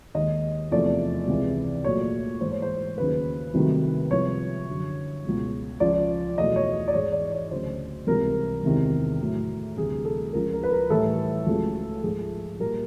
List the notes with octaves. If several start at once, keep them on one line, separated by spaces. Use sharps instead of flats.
D#2 D#3 G#3 D#5
E2 C3 F3 A3 D5
C#2 C3 E3 G#3
A#2 F#3 A3 C#5
G#2 E3 A3 C5
C#5
C5
D#2 C#3 F#3 B4
C2 C3 D#3 F#3 A3
C2 C3 F3 G#3 C#5
F#2 D3 F#3
C#2 B2 G#3
C#2 C#3 F3 D5
E2 B2 F#3 A3 D#5
C#5
D5
G#2 E3 G#3 C#5
D5
C#5
D2 C#3 F#3 C5
C#2 C3 E3 G3 A#4
E2 C3 D#3 G#3
A2 F#3 A3
D2 C3 E3 G3 G#4
A4
C#2 C#3 F3 A#4
A#4
B4
A#4
A2 E3 G3 A4
C#2 C#3 F#3 A3
G#2 F3 G#3 G#4
A#2 G3 A#4